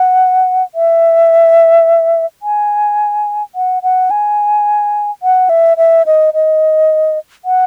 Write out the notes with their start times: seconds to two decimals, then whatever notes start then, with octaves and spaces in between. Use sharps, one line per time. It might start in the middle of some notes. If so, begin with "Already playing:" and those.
Already playing: F#5
0.75 E5
2.42 G#5
3.55 F#5
3.83 F#5
4.10 G#5
5.23 F#5
5.49 E5
5.77 E5
6.06 D#5
6.34 D#5
7.45 F#5